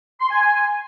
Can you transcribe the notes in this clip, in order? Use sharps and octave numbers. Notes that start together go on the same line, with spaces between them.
C6
G#5
G#5